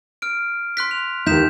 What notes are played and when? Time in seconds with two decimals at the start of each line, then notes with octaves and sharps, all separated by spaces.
0.22 F6 D7
0.77 C6 F#6 B6
0.91 F7
1.26 D#2 D#4 G6 B6 E7